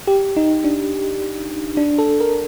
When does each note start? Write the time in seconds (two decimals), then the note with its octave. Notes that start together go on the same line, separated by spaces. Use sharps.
0.07 G4
0.36 D#4
0.64 D4
1.77 D4
1.98 A4
2.21 A#4